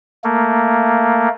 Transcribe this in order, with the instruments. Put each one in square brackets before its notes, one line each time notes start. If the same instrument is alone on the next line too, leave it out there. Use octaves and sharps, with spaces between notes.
[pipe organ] A3 A#3